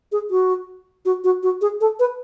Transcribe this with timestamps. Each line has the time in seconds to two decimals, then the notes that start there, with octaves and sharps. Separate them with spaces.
0.12 G#4
0.31 F#4
1.05 F#4
1.24 F#4
1.43 F#4
1.61 G#4
1.81 A4
1.99 B4